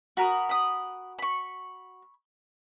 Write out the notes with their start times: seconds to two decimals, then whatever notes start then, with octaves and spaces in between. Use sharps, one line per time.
0.17 F#4 A#4 B5 D#6
0.49 B5 D#6
1.19 B5 C#6